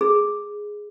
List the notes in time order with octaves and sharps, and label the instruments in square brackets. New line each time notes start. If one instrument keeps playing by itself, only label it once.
[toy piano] G#4